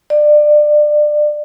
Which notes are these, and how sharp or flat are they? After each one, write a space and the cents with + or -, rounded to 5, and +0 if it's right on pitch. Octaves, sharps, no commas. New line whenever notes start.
D5 +25